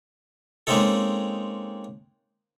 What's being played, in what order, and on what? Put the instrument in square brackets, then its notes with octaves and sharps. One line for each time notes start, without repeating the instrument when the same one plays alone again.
[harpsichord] G#3 A#3 C4 C#4 D#4 A4